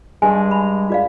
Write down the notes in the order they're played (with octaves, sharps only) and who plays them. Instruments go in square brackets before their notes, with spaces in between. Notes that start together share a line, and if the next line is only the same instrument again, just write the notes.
[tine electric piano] G2 G#3 [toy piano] G#5
[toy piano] B5
F4 D5 F5